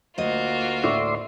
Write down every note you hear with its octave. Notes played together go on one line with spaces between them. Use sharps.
D2 A#3 F4 F#4 D#5
A2 D5 E5 C6 C#6